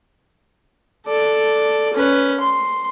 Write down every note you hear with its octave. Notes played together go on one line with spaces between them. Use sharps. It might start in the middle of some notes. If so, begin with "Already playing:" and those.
A4 D5
C#4 B4
C6